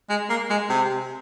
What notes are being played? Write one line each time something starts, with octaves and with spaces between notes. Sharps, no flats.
G#3
A#3
G#3
C3